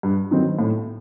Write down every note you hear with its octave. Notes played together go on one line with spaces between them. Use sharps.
G2
D#3 F#3 C4 D#4
A2